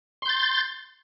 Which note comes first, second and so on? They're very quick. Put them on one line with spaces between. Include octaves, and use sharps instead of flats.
C6 G6 A6